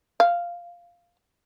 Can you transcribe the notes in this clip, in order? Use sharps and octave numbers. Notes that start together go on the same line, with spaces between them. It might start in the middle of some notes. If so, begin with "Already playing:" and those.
F5